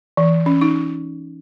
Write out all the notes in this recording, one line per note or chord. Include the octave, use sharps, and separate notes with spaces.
E3
C#4
D#4